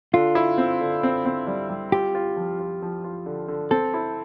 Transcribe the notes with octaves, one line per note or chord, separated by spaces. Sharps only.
D3 F4
E4
C4
D3
C4
C4
G3
G3
F4 G4
F4
F3
F4
F3
F4
D3
D3
C4 A4
E4